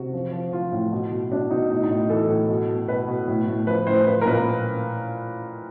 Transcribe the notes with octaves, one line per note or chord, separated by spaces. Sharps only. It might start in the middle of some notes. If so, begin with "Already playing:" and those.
Already playing: C3 F#4
F3
F3
F3 F4
A2
B2
B2
B2 D4
B2 D#4
A2 D#4
D#4
A2
E3 A4
A2
B2
B2
B2 B4
B2
A2
A2
F3 B4
A2 C5
F3 B4
A#4
A#2 B4